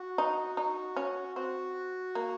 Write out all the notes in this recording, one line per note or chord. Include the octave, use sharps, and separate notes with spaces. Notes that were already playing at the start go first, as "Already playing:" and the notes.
Already playing: F#4
D#4
D#4
C#4
C4 F#4
A#3